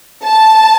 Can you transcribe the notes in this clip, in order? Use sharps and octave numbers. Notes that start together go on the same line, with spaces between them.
A5